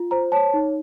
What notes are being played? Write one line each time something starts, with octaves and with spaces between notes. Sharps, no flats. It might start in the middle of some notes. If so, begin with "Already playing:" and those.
Already playing: F4
C5 A#5
C#5 A5
D#4